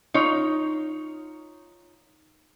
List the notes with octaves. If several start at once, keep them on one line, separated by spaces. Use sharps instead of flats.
D#4 F4 C#5